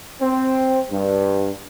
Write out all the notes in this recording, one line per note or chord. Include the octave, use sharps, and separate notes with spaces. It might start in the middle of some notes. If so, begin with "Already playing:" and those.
C4
G2